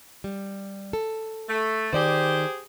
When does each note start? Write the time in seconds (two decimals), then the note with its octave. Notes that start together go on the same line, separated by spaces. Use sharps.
0.24 G3
0.93 A4
1.48 A3
1.93 D#3 G4 G#4 C5 D5